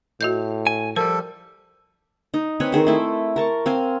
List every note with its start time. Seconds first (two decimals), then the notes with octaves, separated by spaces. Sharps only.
0.21 A2 F#4 D#5 G6
0.67 G#5
0.96 F3 G3 A4 A#4
2.34 D#4
2.60 C4 B4 C#5 G#5
2.72 D#3 G#4 C5
2.87 A3 E4
3.36 A#4 A5 C#6
3.66 C4 F5 G#5